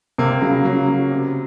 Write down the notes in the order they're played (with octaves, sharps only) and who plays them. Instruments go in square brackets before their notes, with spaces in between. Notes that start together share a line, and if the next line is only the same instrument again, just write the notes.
[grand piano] C3 [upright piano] A#3
[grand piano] C#3 [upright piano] F#3
[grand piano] C#3 [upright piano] F#3
[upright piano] F#3
C3